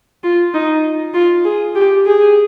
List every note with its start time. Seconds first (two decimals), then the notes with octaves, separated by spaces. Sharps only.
0.23 F4
0.54 D#4
1.14 F4
1.45 G#4
1.75 G4
2.06 G#4